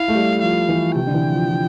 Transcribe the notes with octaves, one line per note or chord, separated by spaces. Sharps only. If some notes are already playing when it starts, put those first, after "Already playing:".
Already playing: E4 F5
A3
G3
F3 F5
E3
C3 G5
D3
E3
F3
F3